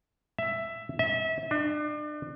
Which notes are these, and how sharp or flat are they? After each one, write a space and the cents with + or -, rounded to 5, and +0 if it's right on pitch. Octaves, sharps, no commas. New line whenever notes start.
E5 +10
E5 -30
D4 +35